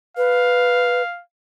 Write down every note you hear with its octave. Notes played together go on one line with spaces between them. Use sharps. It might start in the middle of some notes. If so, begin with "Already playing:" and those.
B4 F5